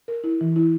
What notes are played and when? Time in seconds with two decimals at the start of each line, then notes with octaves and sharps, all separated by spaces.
0.08 A#4
0.24 E4
0.41 E3
0.56 E4